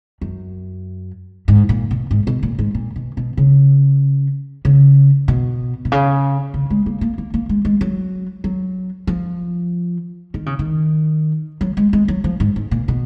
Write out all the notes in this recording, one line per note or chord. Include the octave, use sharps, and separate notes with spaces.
F#2
G#2
A#2
B2
G#2
B2
A#2
G#2
A#2
B2
B2
C#3
C#3
B2
B2
C#3
C#3
G#3
A#3
A#3
A#3
A#3
G#3
G#3
F#3
F#3
F3
D#3
C#3
D#3
F#3
G#3
G#3
F#3
F3
G#2
G#2
A#2
B2